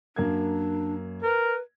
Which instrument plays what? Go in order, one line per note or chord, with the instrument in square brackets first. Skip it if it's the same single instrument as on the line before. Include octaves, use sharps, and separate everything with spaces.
[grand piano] F#2 A#3 G#6 [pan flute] D4
[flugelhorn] A#4 [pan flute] B4